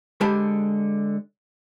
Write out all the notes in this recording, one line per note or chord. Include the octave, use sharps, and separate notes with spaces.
D3 G#3 G4 C5 A5 B5